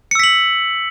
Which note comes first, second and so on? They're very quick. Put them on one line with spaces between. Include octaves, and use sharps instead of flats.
C#7 E6 B6 F#7